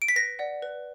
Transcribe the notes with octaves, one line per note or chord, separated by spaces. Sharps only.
D7
B6
B4 A#6
D5 F#5
B4